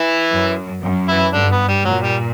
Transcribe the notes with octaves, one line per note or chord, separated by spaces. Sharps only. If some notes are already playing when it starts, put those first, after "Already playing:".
Already playing: E3 E4
F#2
F#2
E3 E4
G2 D3 D4
B3
G3
A#2 F#3
G3